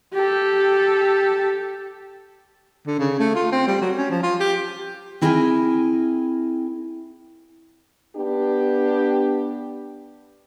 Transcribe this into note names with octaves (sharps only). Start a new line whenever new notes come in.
G4 A4
D3
C#3
A3
F4
C4
G3
F#3
C#4
F3
F4
G4
C4 E4 G#4 A#4 G5 G#5
B3 D4 G4